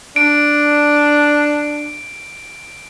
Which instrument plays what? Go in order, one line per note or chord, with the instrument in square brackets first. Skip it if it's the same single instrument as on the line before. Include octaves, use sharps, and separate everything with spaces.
[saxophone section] D4 [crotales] D7